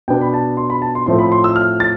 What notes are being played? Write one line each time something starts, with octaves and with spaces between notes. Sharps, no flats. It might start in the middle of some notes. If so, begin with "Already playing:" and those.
B2 B3 D4 G5
B5
A5
C6
B5
A5
C6
A2 F3 A3 C4 C6
B5
C6
E6
F6
A6